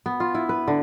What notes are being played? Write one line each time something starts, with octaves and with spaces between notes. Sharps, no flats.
B3
F4
E4
B4
D3